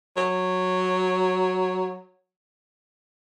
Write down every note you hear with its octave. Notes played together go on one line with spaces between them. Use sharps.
F#3